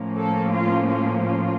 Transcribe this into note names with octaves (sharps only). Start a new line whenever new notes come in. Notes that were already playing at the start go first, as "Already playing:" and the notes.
Already playing: A2 F3 A#3 C#4
A4
F4
F4
F4